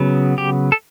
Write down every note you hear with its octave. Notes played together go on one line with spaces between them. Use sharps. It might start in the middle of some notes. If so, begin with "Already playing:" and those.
Already playing: C#3 F#3 B3
G4
A4